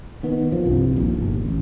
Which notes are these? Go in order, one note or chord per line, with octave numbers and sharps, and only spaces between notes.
D#3 B3
F3
C2 G2
A#1 D#2
G1
A1